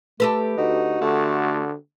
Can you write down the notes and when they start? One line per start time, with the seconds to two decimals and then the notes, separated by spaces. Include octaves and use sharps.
0.20 A3 G4 A4 B4
0.58 D2 D#4 F#4
1.01 D3 A3